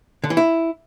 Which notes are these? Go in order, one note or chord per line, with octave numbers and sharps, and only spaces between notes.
D3
E3
E4